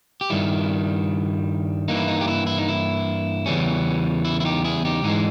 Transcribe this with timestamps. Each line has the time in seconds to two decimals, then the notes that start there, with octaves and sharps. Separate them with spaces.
0.21 G4
0.30 G2 D#3 G3 E4
1.88 G2 E3 A#3 D#4
1.97 E4
2.08 D#4
2.21 G4
2.28 E4
2.47 E4
2.58 D#4
2.69 E4
3.46 E2 C#3 E3 G3 C#4
4.25 E4
4.40 E4
4.45 D#4 G4
4.64 E4 G#4
4.85 D#4 G4
5.03 G#2 E3 G#3 D#4